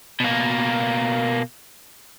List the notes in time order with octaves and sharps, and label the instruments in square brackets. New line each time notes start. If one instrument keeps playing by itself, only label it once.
[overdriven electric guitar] B2 A#3